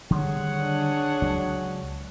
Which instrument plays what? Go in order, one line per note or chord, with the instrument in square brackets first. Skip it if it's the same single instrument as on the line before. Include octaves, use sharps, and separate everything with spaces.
[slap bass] D3 D#3 G3 [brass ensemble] G#4 C#5 F#5
[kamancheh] D4
[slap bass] C#2 F#3